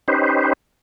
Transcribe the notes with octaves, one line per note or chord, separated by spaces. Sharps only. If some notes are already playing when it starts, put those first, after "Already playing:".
C#4 D#4 G4 B4 C5